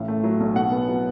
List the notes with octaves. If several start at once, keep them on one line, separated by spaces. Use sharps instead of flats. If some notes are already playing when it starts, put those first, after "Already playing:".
Already playing: A1 A2 F5
A3
F#3
B1
B2 F#5
B3
F#3